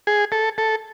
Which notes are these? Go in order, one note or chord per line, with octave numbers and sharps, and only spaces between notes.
G#4
A4
A4